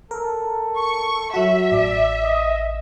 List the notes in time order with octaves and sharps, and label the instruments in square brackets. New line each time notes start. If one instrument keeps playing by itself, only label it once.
[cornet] A4 [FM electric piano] A#4
[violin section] C#6
[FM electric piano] F#3 F#4 [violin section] E5
[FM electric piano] A1 [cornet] D5
[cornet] D#5